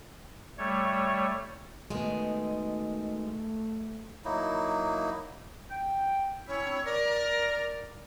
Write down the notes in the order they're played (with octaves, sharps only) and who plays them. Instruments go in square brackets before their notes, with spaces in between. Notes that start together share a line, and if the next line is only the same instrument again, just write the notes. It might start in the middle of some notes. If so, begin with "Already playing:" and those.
[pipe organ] G3 A3 C#5
[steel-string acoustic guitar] B2 D#3 G#3 [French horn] A3
[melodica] F#3 A#3 D#4 E4
[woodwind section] G5
[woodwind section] C#4 E4 [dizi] C#5
[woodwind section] C4 D4 E4
[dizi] A#4 [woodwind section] D5